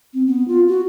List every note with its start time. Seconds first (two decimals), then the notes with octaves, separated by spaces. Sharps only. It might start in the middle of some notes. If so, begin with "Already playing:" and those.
0.14 C4
0.27 B3
0.48 F4
0.68 F#4